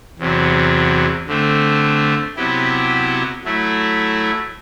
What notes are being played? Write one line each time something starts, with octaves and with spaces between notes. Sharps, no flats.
E2 C3 F#3
D3 A3 C4
C3 F#3 B3 E4 G4
F#3 A3 E4